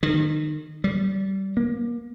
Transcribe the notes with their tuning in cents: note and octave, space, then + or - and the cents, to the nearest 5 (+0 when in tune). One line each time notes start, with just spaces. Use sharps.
D#3 -30
G3 -25
A#3 +30